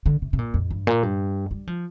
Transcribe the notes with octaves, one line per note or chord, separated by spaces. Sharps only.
D3
C3
C3
A#2
F2
G2
A#2
G2
G3
F3